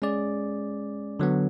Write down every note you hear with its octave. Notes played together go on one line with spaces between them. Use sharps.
G#3 C#4 G#4 D5
D3 F#3 B3